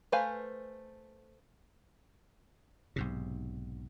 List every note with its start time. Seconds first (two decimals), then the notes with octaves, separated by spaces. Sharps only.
0.12 A3 B4 C5 F5 G#5
2.96 B1 G#2 C3